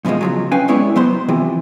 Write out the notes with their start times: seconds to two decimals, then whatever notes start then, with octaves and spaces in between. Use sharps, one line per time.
0.05 F#2 B2 E3 F3 G#3
0.21 C#3 F3 F#3
0.51 C#4 B4 F5 G5 G#5
0.68 C3 G#3 B3 E4 C#5 D5
0.96 F#3 B3 C5
1.29 C3 E3 F3